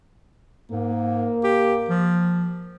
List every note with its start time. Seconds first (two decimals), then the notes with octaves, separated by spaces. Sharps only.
0.72 G#2 A#3
1.44 G4
1.89 F3